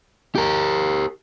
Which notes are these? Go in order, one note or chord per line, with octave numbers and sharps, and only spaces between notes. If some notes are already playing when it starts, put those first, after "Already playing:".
G4 A#4